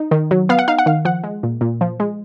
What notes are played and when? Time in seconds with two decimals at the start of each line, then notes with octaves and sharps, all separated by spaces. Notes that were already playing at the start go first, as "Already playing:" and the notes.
Already playing: D#4
0.11 D#3
0.31 F#3
0.49 B3 F5
0.59 F#5
0.68 D#4 F5
0.78 F#5
0.86 D#3 F5
1.05 F3 F#5
1.24 G#3
1.43 A#2
1.61 A#2
1.81 F3
2.00 G#3